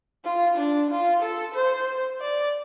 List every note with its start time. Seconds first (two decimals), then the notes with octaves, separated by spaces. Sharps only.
0.24 F4
0.57 D4
0.91 F4
1.22 A4
1.54 C5
2.20 D5